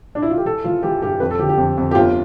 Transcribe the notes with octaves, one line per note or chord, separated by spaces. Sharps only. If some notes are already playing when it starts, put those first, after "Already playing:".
D4
E4
F4
G4
E3 A4
E3 F4
E3 G4
G2 G4
F2 B4
A4
D3 G4
G4
F2
F2
G4
G1 F4